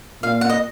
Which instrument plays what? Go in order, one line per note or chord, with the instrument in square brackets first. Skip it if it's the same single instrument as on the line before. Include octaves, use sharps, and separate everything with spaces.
[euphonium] A#2 [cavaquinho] F5
[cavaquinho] F#5
D#5